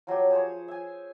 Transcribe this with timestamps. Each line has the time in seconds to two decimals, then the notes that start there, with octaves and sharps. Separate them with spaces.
0.07 F3 F#3 A3 G4
0.31 G#4 C5 C#5
0.68 E5 G#5